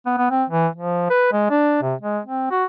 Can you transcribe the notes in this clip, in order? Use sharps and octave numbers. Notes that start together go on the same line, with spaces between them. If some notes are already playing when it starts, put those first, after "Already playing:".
B3
B3
C4
E3
F3
B4
G#3
D4
C3
G#3
C4
F#4